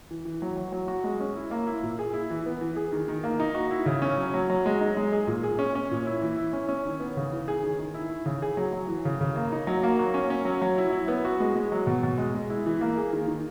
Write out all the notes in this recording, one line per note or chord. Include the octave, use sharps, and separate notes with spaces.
E3
E3
F#3
F#3
F#3
F#4
G#3
C#4
E4
A#3
E4
A#2
G#4
E4
E3
B3
E3
G#4
D#3
D#3
A#3
D#4
F#4
E4
C#3
C#4
F#3
F#3
F#3
G#3
D#4
G#3
G#4
A#2
G#4
C#4
C#4
A#2
E4
E3
E4
C#4
C#4
D#3
B3
C#3
E3
G#4
D#3
D#3
E4
E4
C#3
G#4
F#3
F#3
E3
C#3
C#3
A#3
D#4
F#3
A#3
F#4
C#4
C#4
F#3
F#3
E4
E4
B3
F#4
G#3
G#3
F#3
B2
B2
G#3
G#3
E4
E3
A#3
G#4
D#3
D#3